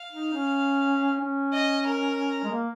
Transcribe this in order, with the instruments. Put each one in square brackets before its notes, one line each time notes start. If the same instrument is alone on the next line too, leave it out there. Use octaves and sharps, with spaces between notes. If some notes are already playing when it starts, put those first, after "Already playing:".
Already playing: [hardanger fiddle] F5
[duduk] D#4
C#4
C#4
[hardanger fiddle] D#5
A#4
[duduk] G#3
A#3